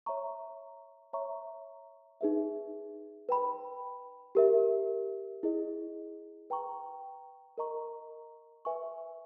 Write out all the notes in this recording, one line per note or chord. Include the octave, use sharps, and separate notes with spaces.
C#5 E5 A#5 C#6
C#5 E5 A#5 C#6
D#4 G#4 B4 E5
B4 G5 B5
G4 A#4 E5
E4 G#4 D#5
B4 G5 A#5 C#6
A#4 D#5 A#5 C#6
B4 E5 G#5 C#6